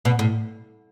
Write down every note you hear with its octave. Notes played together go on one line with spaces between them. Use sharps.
B2
A2